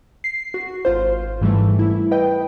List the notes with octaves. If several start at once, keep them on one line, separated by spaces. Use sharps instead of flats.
C7
F#4
G#1 F4 C5
G#2 E3 G3 A3
E4
B4 D#5 G5